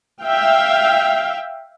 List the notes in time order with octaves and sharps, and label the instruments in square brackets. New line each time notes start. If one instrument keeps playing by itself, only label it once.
[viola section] E5 F5 G5